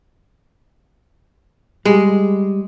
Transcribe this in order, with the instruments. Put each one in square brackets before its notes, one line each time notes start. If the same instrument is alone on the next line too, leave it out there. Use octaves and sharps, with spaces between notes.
[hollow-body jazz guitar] G3 [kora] G#3